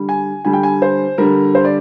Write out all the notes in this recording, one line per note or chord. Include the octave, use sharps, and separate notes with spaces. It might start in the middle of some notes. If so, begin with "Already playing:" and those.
Already playing: D3 G3
G#5
D3 G3 G#5
G5
G#5
C5
D3 G3 A#4
C5
D5